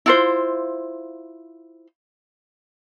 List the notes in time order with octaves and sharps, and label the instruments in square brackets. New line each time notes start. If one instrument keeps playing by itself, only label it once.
[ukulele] E4 F4 C5